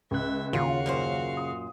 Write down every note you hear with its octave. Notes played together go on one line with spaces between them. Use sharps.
C#2 E5 F#6
D#2 C#3 F4 F#4 F5
F#2 A#2 C5
D#6